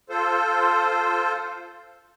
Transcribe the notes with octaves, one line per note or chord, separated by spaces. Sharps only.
F4 A4 C5